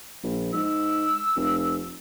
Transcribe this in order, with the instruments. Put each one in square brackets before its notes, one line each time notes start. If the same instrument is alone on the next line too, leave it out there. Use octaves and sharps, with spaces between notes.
[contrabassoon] A#1
[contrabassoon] G#2 [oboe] E6
[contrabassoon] F1